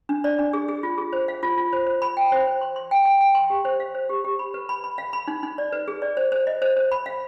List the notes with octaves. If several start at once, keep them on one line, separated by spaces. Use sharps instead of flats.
D4
D5
D4
G#4
G#4
F4
G#4
C5
F5
F4
F4
C5
C5
B5
G5
C5
C5
C6
C6
G5
G5
G5
C6
G4
C5
F5
C5
G4
G4
B5
B4
B5
B5
F5
B5
D#4
D#4
D5
B4
G#4
D5
C5
C5
D#5
C5
C5
B5
F5